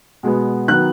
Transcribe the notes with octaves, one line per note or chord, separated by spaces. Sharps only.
B2 G#3 B3
D#3 F#3 B3 F#6